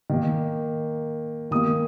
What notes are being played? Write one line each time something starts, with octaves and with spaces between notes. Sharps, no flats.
D#3 A#3
D#3 A#3 D#6